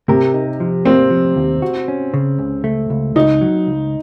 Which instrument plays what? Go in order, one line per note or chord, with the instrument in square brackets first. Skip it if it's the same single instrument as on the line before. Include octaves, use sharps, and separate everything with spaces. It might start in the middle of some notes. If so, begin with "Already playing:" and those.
[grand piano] C3 [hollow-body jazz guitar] A#4
[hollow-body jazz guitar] D#4
F3
[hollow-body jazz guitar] A#3 [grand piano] C4
[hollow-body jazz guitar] F3
D#2
F#4
C#4
C#3
C#2
A3
C#2
[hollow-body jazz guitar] C#2 [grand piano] D#4
[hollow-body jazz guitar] F#3
C#2